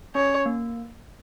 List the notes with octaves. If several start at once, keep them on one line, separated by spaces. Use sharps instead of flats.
C#4 C#5
A#3